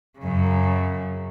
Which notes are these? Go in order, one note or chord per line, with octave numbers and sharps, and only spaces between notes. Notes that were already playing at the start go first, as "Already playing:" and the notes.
F#2 C#3